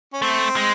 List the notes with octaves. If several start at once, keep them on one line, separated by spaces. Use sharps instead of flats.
C#4
A3 C4
G#3